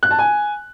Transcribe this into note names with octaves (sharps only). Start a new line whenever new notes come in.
F#6
A5
G#5